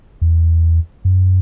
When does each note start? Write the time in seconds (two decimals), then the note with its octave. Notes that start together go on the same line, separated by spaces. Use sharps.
0.21 E2
1.05 F#2